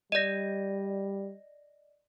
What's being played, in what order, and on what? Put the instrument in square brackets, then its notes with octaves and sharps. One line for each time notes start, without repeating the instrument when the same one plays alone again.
[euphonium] G3 [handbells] D5 D#5 [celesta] A#6 D#7